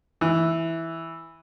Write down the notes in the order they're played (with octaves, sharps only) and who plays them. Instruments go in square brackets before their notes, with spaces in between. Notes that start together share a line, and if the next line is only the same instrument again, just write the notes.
[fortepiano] E3